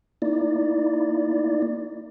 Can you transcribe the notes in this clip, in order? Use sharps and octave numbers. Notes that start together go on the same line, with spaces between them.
A#3 D#4 E4 D5